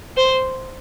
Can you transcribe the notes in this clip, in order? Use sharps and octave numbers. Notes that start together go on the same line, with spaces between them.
C5